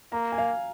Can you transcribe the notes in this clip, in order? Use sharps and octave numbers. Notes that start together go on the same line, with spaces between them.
A#3 A#5
G#5
F5